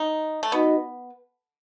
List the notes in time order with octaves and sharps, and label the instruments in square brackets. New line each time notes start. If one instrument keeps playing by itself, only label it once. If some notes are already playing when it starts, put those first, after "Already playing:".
Already playing: [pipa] D#4
A3
[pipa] B3 [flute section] D#4 F#4 B4 D#5